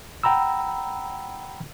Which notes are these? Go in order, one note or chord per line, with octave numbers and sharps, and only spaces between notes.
F#5 G5 A#5 B5 E6